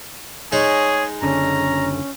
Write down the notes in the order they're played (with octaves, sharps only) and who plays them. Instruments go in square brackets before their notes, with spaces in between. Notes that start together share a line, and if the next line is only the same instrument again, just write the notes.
[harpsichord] G#3 D#4 [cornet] G#4 [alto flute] C#5
[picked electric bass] F#1 D3 [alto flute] C#4 [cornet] A#5